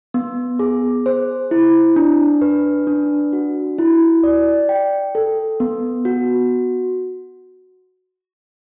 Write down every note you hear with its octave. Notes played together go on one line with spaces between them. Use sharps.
B3
G#4
C5
E4
D4
B4
D4
F#4
E4
D5
G5
A4
B3
F#4